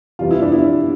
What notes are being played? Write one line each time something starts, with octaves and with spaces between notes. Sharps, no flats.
C3 E3 G3 F4
E4
D4
E4